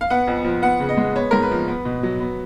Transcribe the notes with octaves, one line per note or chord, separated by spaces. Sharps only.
F5
B3 F#5
F2
F3
B3 F#5
C#3
D#5
G#3
B3 C#5
G#2 A#4
B4
F3
B3
B2
F#3
B3